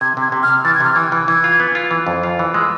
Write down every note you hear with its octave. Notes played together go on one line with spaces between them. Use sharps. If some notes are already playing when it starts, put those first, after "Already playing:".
C3 G#6
C3 G#6
C3
F6
C3
E3 A6
G#6
C3 F6
E3 G#6
E3
E3 G#6
F4
B3
F4
E3
F2
F4
E3
G#3 E6